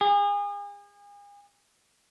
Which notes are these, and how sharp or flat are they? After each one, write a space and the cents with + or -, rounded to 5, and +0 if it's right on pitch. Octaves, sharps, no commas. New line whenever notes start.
G#4 -35